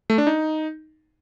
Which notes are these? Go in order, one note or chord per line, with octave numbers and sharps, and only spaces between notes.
A3
D4
D#4